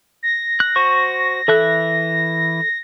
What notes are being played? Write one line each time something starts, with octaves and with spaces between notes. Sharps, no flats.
A#6
F#6
F#4 C5 C#6
E3 A4 E5 F#6